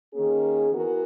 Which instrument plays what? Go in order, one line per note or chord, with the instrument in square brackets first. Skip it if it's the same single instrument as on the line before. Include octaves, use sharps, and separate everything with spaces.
[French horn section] D#3 A#3 C#4 G#4
E3 B3 F#4 A#4